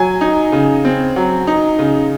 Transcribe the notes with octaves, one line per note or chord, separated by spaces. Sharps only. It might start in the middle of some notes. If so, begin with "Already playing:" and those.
Already playing: F#3 G#5
D#4
C#3
C4
F#3
D#4
C#3